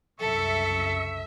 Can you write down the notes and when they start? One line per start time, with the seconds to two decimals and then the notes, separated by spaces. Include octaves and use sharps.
0.20 C2 F#2 C#3 A4 E5 C#6